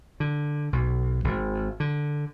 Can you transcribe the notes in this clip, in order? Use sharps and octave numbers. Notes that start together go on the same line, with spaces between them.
D3
B1
G#1
D3